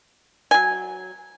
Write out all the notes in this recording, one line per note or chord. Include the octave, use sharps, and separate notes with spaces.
F#3 G#5